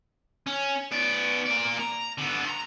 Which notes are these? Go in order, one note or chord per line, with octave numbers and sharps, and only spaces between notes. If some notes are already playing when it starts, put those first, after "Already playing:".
C#4
B3 D5
A#3 D5
A#5
D3 B3
A#5 C6